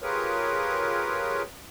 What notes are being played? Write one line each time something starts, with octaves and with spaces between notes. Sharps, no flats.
F4 G4 G#4 A#4 B4 C#5